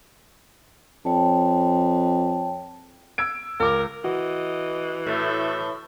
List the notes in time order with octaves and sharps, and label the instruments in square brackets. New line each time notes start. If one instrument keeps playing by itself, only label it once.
[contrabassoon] F2 [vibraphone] C#5 G5 A5
[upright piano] E6 G#6 D7
[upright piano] C#2 D6 [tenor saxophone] A#4
[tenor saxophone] E3 [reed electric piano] F#4 [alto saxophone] D#5
[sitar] A2 [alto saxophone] A3